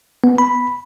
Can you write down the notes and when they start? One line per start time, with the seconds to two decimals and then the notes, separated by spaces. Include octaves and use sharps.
0.24 B3
0.38 B5